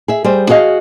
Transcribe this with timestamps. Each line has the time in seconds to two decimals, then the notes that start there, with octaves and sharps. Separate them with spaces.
0.08 G#4 E5
0.24 G3 G#4 C5
0.49 F#4 G#4 D#5 F5